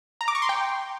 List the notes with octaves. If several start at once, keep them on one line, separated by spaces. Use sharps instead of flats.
A#5
D6
C#6
C6
G5